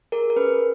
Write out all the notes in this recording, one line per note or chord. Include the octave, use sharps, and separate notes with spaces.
G#4 A#4
A#4
C#4 B4